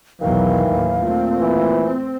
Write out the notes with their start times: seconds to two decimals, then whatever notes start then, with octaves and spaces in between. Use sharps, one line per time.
0.21 B1 E2 D#3 E3 F#3 F5
0.69 D#2 A2
1.03 A#2 A3 C4
1.40 E3
1.85 C4